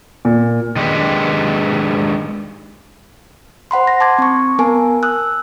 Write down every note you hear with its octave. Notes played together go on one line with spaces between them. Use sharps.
A#2
D#3 G#3 D4 G4 B4
C5 F#5 B5 C6
A#6
A5 C6 D6 G#6 A6
C4 C#6
B3 A#4 G#5 A5
D#6 E6 F#6